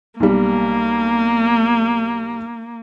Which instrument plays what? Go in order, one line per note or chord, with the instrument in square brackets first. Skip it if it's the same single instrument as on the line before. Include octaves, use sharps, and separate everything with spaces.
[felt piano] B1 G3 [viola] A#3